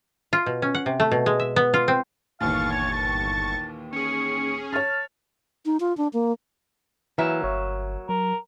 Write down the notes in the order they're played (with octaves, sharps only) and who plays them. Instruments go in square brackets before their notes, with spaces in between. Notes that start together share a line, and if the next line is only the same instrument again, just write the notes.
[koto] F4
B2
C#4
F#5
C3
A3
B2
G#3
E5
B3
F4
C4
[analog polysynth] G1 C#6 A6 [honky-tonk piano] D#2 A#2 E3 [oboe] F5
[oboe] C#5
A5
[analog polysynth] C#4 G#4 [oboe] C#6
[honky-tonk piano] C#5 F6 [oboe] A5
[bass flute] D#4
F4
D4
A#3
[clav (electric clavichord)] E3 [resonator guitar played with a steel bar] F#3 A#3 E5
[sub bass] G1 [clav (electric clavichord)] C#5
[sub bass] F#3 [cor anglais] A#4